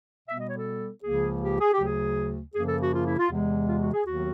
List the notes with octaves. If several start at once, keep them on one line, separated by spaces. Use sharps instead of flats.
B2 G3 B3 E5
D#5
C#5
A4
C#2 C#3 F3 A#3 G#4
G4
G#4
G4
D2 C#3 F#3 G#4
F#2 C#3 F3 A#3 G#4
A4
F#4
F4
E4
F4
E2 C3 E3 G#3
F4
F#4
G#4
D#2 D#3 F#3 B3 F#4